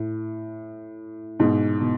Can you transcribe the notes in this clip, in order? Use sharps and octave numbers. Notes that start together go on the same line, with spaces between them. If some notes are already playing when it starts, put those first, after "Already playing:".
Already playing: A2
G#2 B2
B2